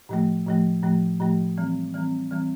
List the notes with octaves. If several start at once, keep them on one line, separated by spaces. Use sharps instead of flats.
A2 F3 A3
A2 F3 A3
A2 F3 A3
A2 F3 A3
E3 G3 C4
E3 G3 C4
E3 G3 C4